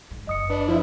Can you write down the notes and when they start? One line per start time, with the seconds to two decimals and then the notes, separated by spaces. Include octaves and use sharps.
0.11 G#2
0.27 F#1 D#5 D#6 C#7
0.50 D4 B4
0.68 F3 E4